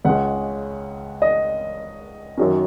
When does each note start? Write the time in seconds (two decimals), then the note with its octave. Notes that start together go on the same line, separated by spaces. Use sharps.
0.05 C#2 C#3 G#3 C#4 F#5
1.22 D#5
2.38 F#2 D#3 F#3 C#4